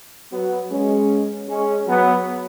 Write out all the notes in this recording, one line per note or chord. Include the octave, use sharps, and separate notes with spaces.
F#3 B3
G#3 C#4
G#3 C#4
F#3 B3